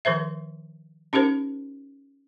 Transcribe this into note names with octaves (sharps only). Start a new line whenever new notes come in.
D#3 F3 B4 C5 E5
C#4 D#4 G4 A#4 C5